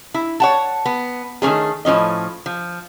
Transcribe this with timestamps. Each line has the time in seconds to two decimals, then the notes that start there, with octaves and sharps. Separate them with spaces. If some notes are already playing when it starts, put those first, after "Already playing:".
0.14 E4
0.40 C#5 F#5 A5
0.86 B3
1.42 D#3 A3 A#3 C#4 G#4
1.85 A2 F3 C#4 D#5
2.46 F3